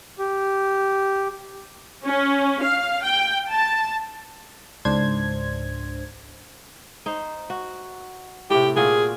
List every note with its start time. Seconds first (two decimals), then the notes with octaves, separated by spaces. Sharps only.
0.19 G4
2.05 C#4
2.62 F5
3.03 G5
3.50 A5
4.85 C#2 G#2 D4 C5 G#6
7.06 D#4 C5
7.50 F#4
8.50 A2 C3 G4
8.76 A#2 F4 F#4 G#4